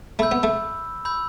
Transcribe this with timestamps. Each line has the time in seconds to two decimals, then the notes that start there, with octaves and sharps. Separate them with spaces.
0.19 A3 B5 E6 G6
0.31 B3
0.43 A3
1.05 B5 E6 G6